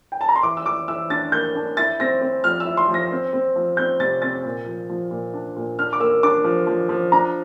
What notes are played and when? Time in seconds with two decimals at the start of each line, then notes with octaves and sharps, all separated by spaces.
0.12 G5
0.21 A5
0.29 A#5
0.36 C6
0.43 E3 D6
0.57 E6
0.66 E3 D6
0.88 E3 E6
1.10 D4 A6
1.32 A#3 G6
1.55 D4
1.77 E4 A6
2.00 C4 A#6
2.21 C4
2.44 F3 F6
2.60 E6
2.66 E4
2.77 C6
2.89 F3
2.94 A#6
3.11 C4
3.33 C4
3.56 F3
3.77 C4 G6
4.00 C3 A6
4.22 C4 A6
4.45 A#2
4.66 F3
4.90 F3
5.11 A#2
5.34 D4
5.56 A#2
5.79 D4 F6
5.93 D6
6.00 A#3 E6
6.23 D4 D6
6.44 F3
6.67 F3
6.89 F3
7.12 D4 A#5